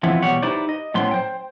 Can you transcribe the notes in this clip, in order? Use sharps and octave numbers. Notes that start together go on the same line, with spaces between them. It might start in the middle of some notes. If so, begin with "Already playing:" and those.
E3 F3 G#3 B3 C4 E4
E2 B2 G3 G4 C#5 F#5
D#4 E4 G4 B4 C5 D5
D#5
A2 F#3 B3 C#4 C5 C6
C5 G5